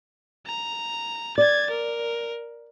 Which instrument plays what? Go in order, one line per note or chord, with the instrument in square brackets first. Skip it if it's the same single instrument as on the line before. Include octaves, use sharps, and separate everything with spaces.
[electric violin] A#5
[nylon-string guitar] D5 [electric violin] G#6 A6
[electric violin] A#4